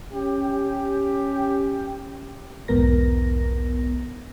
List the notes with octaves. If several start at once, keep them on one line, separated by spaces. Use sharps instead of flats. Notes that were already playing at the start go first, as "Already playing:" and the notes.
C#4 G4
B1 E2 G#2 B3 A#4 A#6